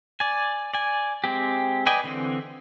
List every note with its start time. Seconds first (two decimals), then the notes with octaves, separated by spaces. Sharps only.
0.20 D5 G#5
0.74 D5 G#5
1.24 G#3 C4 G4
1.86 B4 D5 D#5 G5 G#5
2.04 D3 E3 C4